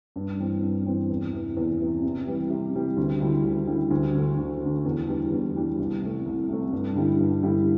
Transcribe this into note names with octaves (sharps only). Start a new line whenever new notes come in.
G2
E3 C4
G2
E3 C4
E2
C3 E3
E2
C3 E3
C3
E3 G3
C3
E3 G3
D2
D3 G3 E4
D2
D3 G3 E4
D2
D3 A3
D2
D3 A3
E2
E3 G3 D4
E2
E3 G3 D4
C2
C3 A3
C2
C3 A3
G2
D3 G3 E4
G2
D3 G3 E4